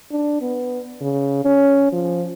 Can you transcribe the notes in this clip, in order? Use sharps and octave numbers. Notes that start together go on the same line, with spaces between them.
D4
B3
C#3
C#4
F3